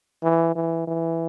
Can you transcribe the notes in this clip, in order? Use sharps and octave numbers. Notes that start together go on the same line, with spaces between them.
E3
E3
E3